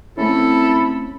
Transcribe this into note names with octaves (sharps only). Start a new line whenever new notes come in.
A3 C4 C#4 E4 A4 B5